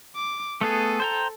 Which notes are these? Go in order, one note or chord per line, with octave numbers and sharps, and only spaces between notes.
D6
A3 B3 G#4 A4
C5 G5 A#5